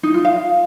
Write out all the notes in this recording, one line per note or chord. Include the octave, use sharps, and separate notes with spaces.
D#4
F4
F5